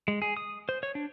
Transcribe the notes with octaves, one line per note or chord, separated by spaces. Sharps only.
G#3
G#4
D#6
C5
C#5
D4